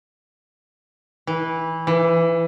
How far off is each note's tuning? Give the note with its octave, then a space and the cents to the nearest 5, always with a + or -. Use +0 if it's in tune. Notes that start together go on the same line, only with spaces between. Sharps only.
E3 -15
E3 +20